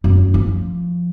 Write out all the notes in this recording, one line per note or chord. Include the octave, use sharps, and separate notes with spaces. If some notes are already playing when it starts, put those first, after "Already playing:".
F#2
F3